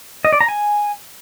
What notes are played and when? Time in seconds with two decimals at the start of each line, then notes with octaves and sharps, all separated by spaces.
0.25 D#5
0.33 D5
0.40 A#5
0.48 G#5